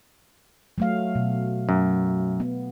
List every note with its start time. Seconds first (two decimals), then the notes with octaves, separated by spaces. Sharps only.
0.78 F#3 A3 F5
1.15 B2
1.69 F#2
2.40 B3